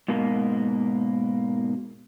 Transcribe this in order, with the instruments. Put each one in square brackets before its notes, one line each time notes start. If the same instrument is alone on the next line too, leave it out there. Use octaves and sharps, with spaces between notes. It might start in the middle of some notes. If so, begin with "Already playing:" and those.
[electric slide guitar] G#2 B2 A#3